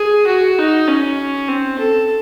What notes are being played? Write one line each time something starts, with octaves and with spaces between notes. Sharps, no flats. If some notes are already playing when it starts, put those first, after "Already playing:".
Already playing: G#4
F#4
D#4
C#4
C4
A4